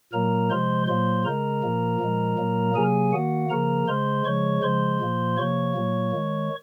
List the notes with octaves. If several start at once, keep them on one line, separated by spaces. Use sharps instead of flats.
A#2 F#3 A#3 A#4 A#5
C3 F3 G#3 C5 C6
A#2 F#3 A#3 C5 C6
C#3 G#3 A#4 A#5
A#2 F3 A#3
A#2 F3 G#3
A#2 F#3 A#3
C3 F#3 A#3 G#4 G#5
D#3 A#3 F#4 F#5
C#3 F3 A#3 A#4 A#5
C#3 G#3 C5 C6
C#3 F3 G#3 C#5 C#6
C#3 F3 G#3 C5 C6
A#2 F3 A#3
C3 F3 A#3 C#5 C#6
A#2 F#3 A#3
D#3 G#3